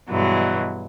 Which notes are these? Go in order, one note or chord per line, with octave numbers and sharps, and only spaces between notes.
G2 B2 E3 F#3 G#3